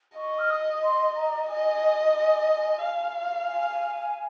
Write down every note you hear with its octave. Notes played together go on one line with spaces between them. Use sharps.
D#5 C#6
F6
D#6
C6
A#5
D#5 G#5
G#5
F5
G#5